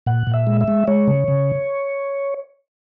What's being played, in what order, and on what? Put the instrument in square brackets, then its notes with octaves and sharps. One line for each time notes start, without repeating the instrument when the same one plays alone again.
[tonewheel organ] A#2 F#5
A#2
E5
G#3
E5
G#3
G#3 C#5
C#3
C#3